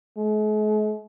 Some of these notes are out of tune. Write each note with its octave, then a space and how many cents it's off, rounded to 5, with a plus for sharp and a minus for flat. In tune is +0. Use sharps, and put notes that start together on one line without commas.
G#3 +45